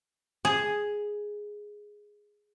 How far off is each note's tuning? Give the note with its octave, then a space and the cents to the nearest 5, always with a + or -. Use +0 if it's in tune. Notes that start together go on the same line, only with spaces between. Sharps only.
G#4 +0 A5 +0